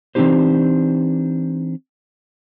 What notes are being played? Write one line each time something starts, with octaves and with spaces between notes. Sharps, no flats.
E3 C4 D4 D#4 G4 C5